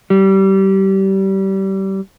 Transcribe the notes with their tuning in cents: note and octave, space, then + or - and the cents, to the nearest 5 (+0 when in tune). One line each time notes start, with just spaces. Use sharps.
G3 -25